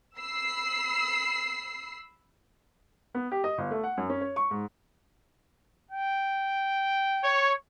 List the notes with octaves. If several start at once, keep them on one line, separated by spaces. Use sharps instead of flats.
B5 E6 C7
B3
G4
D#5
G1
A3
F#5
F#2
C#4
C#5
C#6
G#2
G5
C#5